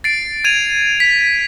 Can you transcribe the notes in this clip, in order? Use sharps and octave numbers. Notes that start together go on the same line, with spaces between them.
A6 C7 D7
G#6 D#7 F7
B6